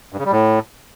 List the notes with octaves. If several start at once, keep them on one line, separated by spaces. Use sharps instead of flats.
G2
C#3
G3
A2